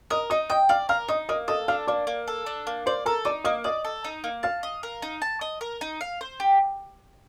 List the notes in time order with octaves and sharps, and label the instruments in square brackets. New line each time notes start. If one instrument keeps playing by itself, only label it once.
[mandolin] A#4 [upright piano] D#5 D#6
[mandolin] D#4 [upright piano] D#5 D#6
[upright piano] D#5 D#6 [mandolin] G5
[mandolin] D5 [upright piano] F5 F6
[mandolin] A#4 [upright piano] F5 F6
[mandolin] D#4 [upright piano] D#5 D#6
[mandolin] A#3 [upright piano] D#5 D#6
[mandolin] A4 [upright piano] D#5 D#6
[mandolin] D4 [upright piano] F5 F6
[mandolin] A#3 [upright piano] D5 D6
[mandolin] A#3
A4
D4
A#3
[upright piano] C5 C6 [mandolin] D5
[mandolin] A4 [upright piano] A#4 A#5
[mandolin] D#4 [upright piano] D5 D6
[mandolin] A#3 [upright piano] D#5 D#6
[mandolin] D5 [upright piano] D#5 D#6
[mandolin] A4
D#4
A#3
[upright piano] F5 F6 [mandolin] A5
[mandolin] D#5
A#4
D#4
A5
D#5
A#4
D#4
F5
C5
G4